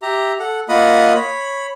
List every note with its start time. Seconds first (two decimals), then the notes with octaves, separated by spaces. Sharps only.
0.02 G4 E5 A#5
0.40 A4 F#5
0.69 A#3 F4 D#5 F#5 B5 D#6
1.15 C#5 B5